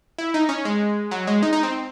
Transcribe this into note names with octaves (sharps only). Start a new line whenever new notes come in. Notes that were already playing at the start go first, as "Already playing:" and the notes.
E4
D#4
C#4
G#3
F#3
G#3
D#4
D#4
C4